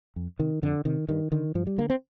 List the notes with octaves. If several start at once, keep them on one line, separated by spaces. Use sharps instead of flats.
F2
C3 D#3
F2 D3
C3 D#3
G2 D#3
D3 D#3
G2 F3
G3
D3 A#3
C4